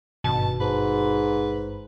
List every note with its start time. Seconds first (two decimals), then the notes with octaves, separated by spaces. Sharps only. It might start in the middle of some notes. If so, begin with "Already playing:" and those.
0.24 G#1 G2 B2 A5
0.61 G#2 B4